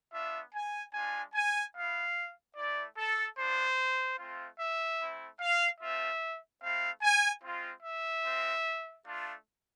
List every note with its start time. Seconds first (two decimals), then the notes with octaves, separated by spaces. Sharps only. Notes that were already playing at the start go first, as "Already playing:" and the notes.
0.13 B3 D4 F4 E5
0.54 G#5
0.94 G#3 D4 F4 G#5
1.35 G#5
1.75 B3 E4 F5
2.56 A3 E4 D5
2.98 A4
3.38 B3 D4 F4 C5
4.19 A3 C4 F4
4.60 E5
5.00 A3 C4 E4
5.41 F5
5.81 A3 C4 F4 E5
6.62 A3 C4 E4 F5
7.03 G#5
7.43 G#3 C4 F4
7.83 E5
8.24 G#3 C4 F4
9.06 A3 D4 F4